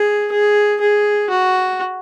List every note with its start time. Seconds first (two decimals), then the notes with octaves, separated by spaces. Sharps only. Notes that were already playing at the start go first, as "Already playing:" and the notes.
Already playing: G#4
0.31 G#4
0.81 G#4
1.30 F#4